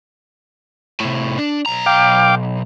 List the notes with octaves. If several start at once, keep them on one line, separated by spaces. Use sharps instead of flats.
A2 C3
D4
B1 A#5
F5 G5 D6